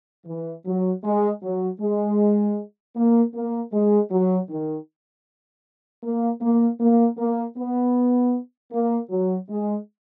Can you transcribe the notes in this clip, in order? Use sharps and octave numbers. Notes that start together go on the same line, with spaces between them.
E3
F#3
G#3
F#3
G#3
A#3
A#3
G#3
F#3
D#3
A#3
A#3
A#3
A#3
B3
A#3
F#3
G#3